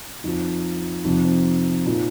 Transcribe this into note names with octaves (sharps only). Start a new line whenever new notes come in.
F2 F3 D#4
F2 C3 F3 D#4
C4
A#2 F3 D#4